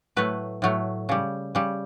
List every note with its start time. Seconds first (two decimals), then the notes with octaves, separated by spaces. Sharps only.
0.16 A2 F#3 A3 B4
0.62 A2 F#3 A3
1.09 C#3 G3
1.55 C#3 G3